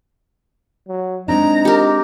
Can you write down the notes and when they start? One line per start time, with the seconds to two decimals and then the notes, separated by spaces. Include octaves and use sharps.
0.88 F#3
1.28 G#3 C4 D4 D#4 A#5
1.65 G4 A#4